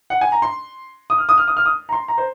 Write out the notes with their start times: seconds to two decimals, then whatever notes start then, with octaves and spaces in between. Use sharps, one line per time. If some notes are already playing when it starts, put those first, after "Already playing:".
0.10 F#5
0.21 G#5
0.32 A#5
0.42 C6
1.10 D#6
1.18 F6
1.29 D#6
1.38 F6
1.48 D#6
1.57 F6
1.66 D#6
1.89 A#5
1.92 C6
2.08 A#5
2.18 C5